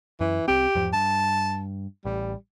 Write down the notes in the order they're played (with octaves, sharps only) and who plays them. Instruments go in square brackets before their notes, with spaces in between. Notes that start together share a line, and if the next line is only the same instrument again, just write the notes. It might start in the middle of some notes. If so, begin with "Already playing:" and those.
[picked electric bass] F#2 [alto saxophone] E3
[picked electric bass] C2 C4 [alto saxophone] G4
[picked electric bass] E2 G#2 F3
[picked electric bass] G2 [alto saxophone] A5
[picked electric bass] A1 [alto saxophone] G3